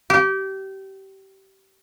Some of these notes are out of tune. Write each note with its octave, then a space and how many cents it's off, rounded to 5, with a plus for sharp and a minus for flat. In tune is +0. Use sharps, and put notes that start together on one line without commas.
G4 -25